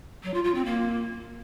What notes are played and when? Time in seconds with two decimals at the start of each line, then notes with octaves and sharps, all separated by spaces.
0.23 F#3
0.33 F4
0.44 F4
0.54 C4
0.65 A#3